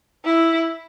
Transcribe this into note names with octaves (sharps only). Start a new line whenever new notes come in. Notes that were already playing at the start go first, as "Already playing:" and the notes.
E4